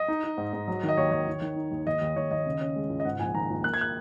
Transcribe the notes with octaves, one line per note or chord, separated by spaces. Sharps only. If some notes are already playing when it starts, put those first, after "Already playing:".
Already playing: D#5
D#4
D#4
G#2
G#2
F#3
D#3
D#5
D#2 C#5
D#2 C#5
D#3
D#3
D#4
D#2
D#2 D#5
D#2
D#2 C#5
D#2 D#5
C#3
C#4
G#3
C#2
D#5
G#2 F#5
A#1 G#5
D#3 A#5
A#1
A#3 F#6
G#6
F#6